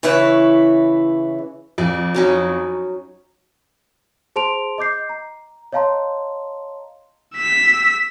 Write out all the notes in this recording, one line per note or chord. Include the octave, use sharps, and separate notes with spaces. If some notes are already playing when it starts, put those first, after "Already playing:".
C#3 E3 E4 B4 C#5
F2 D5
F#3 C#4 D#4
G#4 C5 A5 C6 D7 F7
D#5 D6 G6 C7
A#5
C#5 D#5 F5 A5 A#5 C6
E6 B6